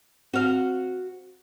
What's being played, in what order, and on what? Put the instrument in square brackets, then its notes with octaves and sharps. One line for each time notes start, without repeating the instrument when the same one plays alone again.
[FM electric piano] C4 [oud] F#4 F5